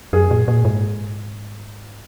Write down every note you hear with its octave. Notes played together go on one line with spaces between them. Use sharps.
F#2 G#4
A#2
A#2
G#2